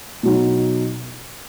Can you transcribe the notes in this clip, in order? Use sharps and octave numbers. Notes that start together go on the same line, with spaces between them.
B2 F#3 D#4